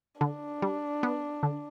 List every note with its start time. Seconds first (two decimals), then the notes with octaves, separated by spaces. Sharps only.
0.21 D3 D4
0.62 G3
1.03 B3
1.43 D3